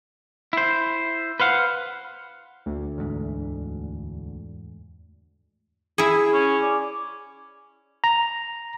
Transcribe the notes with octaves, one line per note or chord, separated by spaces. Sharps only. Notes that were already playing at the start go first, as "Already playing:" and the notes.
E4 C5
B4 C5 F5 F#5
D2
E2 G#2
E4 G#4
C#4
D5
A#5